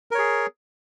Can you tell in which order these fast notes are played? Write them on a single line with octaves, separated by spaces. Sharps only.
A#4 C#5 G#4